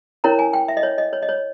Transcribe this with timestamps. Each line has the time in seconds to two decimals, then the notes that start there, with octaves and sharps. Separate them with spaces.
0.24 C#4 E4 A#4 C#5 A#5
0.39 G#5
0.53 G5
0.68 E5
0.77 D#5
0.83 C#5
0.98 D#5
1.13 C#5
1.22 D#5
1.29 C#5